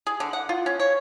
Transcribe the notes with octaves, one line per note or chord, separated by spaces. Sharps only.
G#4
D3
F#5
F4
C#4
C#5